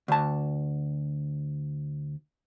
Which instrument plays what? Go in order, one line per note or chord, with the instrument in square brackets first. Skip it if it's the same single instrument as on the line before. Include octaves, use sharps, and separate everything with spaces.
[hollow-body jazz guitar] D2 A5